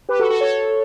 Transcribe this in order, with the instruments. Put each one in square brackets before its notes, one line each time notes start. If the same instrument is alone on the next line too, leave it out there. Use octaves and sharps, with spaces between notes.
[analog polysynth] G4 B4
F#4 A4
F#4 A4
A4 C#5